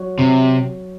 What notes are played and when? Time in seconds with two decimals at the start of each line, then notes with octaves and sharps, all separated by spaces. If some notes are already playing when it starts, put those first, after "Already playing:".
Already playing: F#3
0.19 C3